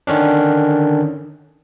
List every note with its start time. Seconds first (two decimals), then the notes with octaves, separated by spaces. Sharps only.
0.07 D3 D#3 C#4 D4